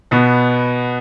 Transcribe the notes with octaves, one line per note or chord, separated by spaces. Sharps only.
B2 B3